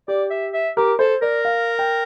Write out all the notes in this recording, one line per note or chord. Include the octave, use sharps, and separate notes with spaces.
G4 D5
E5
E5
G4 A#4
A4 C5
A#4 D5
F5
G5